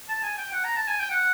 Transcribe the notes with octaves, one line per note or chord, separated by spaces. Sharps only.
A5
G#5
G5
F#5
A#5
A5
G#5
G5
F#5